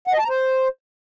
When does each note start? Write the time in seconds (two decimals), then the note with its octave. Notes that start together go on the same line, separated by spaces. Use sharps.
0.07 F#5
0.13 D#5
0.18 A5
0.24 A#5
0.29 C5